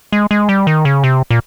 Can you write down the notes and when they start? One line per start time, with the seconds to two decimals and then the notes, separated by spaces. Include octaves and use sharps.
0.12 G#3
0.31 G#3
0.49 G3
0.67 D#3
0.85 C#3
1.04 C3
1.30 A#2